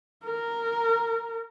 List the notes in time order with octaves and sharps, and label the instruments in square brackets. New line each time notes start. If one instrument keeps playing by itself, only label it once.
[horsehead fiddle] A#4